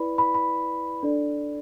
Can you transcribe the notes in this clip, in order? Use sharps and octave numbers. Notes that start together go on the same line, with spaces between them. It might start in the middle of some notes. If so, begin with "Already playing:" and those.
Already playing: E4 B4 D5 B5
B5
B5
D4 A4 D5